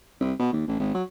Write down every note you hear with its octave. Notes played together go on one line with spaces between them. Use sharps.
C2
B2
D#2
A1
G#1
F#3